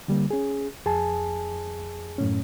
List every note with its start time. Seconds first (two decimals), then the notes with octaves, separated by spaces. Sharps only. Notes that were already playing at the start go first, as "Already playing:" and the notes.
0.08 D3 G3 A#3
0.31 C#4 G#4
0.86 F2 G#4 G#5 A5
2.18 F#2 A2 C#4